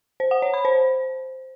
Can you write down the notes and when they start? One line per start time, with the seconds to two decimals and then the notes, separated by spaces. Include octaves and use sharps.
0.20 C5
0.31 F#5
0.42 C#5
0.54 B5
0.65 C5